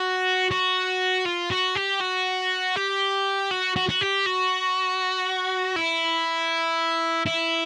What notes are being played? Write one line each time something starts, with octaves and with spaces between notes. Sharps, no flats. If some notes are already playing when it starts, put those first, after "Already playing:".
Already playing: F#4
F#4
F4
F#4
G4
F#4
G4
F#4
F#4
F#4
G4
F#4
E4
E4